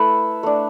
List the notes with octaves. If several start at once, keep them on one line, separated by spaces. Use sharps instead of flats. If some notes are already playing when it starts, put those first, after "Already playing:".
Already playing: A3 E4 A4 B4
A3 D4